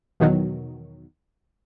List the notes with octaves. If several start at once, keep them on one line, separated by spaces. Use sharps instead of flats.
E2 B2 D#3 F#3